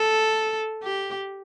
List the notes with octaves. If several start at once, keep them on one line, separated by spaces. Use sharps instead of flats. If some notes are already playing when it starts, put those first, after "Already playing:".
Already playing: A4
G4